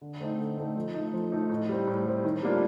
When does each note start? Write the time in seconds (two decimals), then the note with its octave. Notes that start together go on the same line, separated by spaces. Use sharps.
0.01 D3
0.20 A3 C4 D#4
0.38 D3
0.58 A3 C4 D#4
0.76 F3
0.94 A3 D#4
1.13 F3
1.32 A3 D#4
1.49 A2
1.69 G3 C4
1.88 A2
2.06 G3 C4
2.24 D#3
2.43 G3 A#3 D4 F4